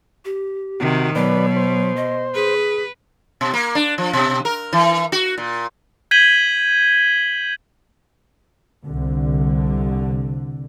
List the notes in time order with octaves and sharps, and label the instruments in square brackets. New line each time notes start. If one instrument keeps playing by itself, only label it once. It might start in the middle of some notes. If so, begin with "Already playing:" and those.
[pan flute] G4
[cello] C3 D#3 [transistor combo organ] F#4
[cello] B2 [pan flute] F#3 [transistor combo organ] B4 D5
[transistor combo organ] C5
[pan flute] D#5
[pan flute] G#4 [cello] B4
[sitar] B2
A#3
D4
F3
B2
A#4
E3
F#4
A#2
[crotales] G6 G#6 B6 D#7 F#7 G7
[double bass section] C2 D3